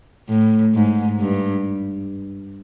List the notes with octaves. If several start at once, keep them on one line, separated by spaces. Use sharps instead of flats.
A2
G#2
G2